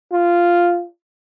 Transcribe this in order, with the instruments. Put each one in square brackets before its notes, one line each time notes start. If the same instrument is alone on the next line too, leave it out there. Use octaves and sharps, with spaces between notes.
[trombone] F4